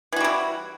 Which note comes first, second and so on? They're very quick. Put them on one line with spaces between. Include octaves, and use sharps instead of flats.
E3 F#4 G3 E4